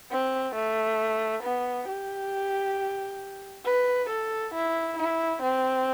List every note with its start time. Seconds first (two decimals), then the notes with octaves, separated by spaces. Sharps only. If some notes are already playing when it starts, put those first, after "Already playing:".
0.11 C4
0.55 A3
1.43 B3
1.89 G4
3.66 B4
4.09 A4
4.54 E4
4.98 E4
5.42 C4